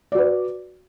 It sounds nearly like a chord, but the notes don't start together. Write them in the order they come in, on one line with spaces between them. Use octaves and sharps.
D5 F#4 B4